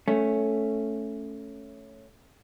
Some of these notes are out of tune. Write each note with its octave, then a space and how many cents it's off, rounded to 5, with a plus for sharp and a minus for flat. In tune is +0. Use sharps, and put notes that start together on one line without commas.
A3 +0 C#4 +0